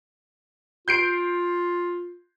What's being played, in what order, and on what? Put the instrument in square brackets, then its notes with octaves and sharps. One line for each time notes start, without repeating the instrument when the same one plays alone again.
[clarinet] F4 [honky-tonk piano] G6 C7 D7